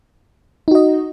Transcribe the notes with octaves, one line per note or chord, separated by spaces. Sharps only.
D#4 F#4 D#5